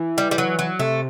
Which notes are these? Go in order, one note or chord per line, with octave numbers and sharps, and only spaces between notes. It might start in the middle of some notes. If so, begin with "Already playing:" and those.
Already playing: E3
G3
G3
F#3
F#3
C3 A3